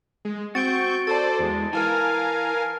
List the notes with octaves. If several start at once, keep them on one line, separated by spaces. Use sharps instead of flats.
G#3
C4 F#4 C#6 G6 A6 D7
A4 C5 D5 A5 A6
E2 G#3
E3 A#4 F5 G#5 A5 F6